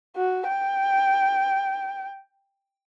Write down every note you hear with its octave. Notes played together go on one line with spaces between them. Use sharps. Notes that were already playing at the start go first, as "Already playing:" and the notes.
F#4
G5